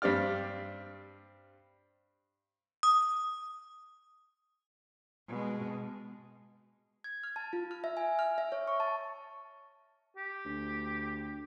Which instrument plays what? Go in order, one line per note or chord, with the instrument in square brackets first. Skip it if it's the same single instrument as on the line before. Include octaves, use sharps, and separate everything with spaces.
[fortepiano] G2 C4 G4 D5 F6
[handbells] D#6
[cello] B2 G#3
[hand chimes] G#6
F6
A5
F4
F6
E5
G#5
F6
E5
C#5
C#6
A5
[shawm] G4
[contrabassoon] D2